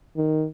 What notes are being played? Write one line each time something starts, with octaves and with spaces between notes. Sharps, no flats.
D#3